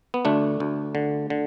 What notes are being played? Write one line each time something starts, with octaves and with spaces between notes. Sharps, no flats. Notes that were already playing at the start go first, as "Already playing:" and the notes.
B3
D2 A3 D4
D2
D3
D3